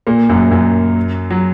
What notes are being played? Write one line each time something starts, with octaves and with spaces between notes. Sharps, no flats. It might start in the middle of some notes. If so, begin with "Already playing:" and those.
A#2 A#3
F#2 F#3
F#2 F#3
F#3